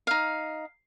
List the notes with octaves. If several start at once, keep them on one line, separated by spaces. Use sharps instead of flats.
D#4 F5